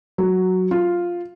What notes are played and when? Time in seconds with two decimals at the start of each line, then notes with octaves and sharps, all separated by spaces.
0.18 F#3
0.71 F4